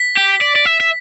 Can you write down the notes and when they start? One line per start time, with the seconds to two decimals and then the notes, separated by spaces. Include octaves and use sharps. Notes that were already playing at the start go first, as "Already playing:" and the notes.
Already playing: B6
0.17 G4
0.41 D5
0.56 D5
0.65 E5
0.80 E5